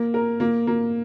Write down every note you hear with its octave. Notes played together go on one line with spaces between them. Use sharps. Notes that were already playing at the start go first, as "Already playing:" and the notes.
Already playing: A#3
A#4
A#3
A#3